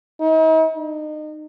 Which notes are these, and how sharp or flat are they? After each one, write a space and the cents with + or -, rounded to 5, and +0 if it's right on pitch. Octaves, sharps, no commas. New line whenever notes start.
D#4 +45
D#4 -30